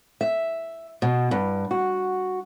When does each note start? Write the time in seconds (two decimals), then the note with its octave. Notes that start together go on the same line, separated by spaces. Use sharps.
0.21 E5
1.02 B2
1.31 G2
1.71 F#4